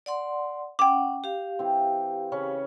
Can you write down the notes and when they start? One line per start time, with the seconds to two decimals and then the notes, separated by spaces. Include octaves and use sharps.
0.06 D5 F#5 C6
0.79 C#4 F#5 G5 D6
1.24 G4 F5
1.59 E3 C4
2.32 C#3 C#4 B5